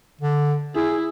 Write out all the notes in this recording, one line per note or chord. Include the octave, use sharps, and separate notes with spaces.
D3
E4 G#4